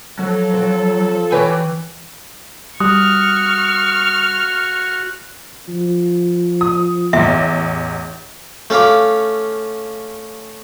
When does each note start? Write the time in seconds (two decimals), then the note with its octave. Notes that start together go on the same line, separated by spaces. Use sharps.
0.19 F3 F#3 A4
0.54 C4
1.32 E3 G4 B4 C#5 G#5
2.80 G3 F#4 C#6 D#6 F6
5.68 F3
6.61 D#6
7.13 A1 E2 E5
8.70 A3 C#4 F5 B5 D6